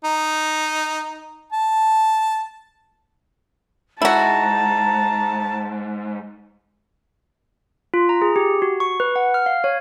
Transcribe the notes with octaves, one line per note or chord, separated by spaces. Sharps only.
D#4
A5
G#2 E4 F#4 A5 A#5
F4
A#5
G#4
G4
F#4
C#6
B4
F#5
F6
F5
C#5